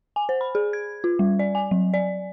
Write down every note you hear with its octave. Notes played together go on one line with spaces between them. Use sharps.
G#5
C5
B5
G#4
G#6
F4
G3
D5
G#5
F#3
D5